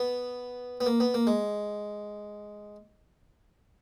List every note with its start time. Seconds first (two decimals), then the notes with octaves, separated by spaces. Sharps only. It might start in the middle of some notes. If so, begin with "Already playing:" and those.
Already playing: B3
0.81 B3
0.86 A#3
1.00 B3
1.14 A#3
1.27 G#3